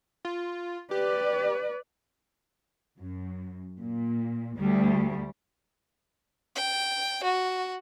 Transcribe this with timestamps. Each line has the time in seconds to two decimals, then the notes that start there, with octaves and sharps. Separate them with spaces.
0.25 F4
0.91 G4 B4 D5
2.99 F#2
3.80 A#2
4.57 D2 G3
6.56 G5
7.23 F#4